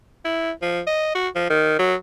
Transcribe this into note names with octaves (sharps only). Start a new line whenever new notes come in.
E4
F3
D#5
F#4
F3
D#3
F#3